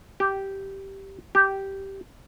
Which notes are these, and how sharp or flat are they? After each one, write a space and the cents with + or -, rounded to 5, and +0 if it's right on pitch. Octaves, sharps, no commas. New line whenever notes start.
G4 -10
G4 -10